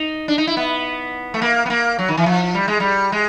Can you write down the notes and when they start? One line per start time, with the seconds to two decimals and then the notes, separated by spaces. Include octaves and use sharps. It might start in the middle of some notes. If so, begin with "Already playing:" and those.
Already playing: D#4
0.28 D4
0.38 D#4
0.47 E4
0.57 B3
1.34 A3
1.42 A#3
1.66 B3
1.70 A#3
1.99 F#3
2.09 D#3
2.17 E3
2.26 F3
2.55 G3
2.68 G#3
2.80 G3
3.12 G#3